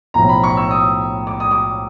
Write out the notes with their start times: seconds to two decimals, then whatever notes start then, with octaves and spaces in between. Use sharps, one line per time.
0.14 B1 A2 F3 A#5
0.29 B5
0.44 C#6
0.57 E6
0.71 D#6
1.27 D6
1.40 D#6
1.51 D6